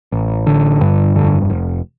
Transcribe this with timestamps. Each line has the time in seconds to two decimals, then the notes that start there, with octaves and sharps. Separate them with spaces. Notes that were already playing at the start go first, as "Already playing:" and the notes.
0.12 A1
0.47 D3
0.81 G2
1.15 F1 D3
1.50 F1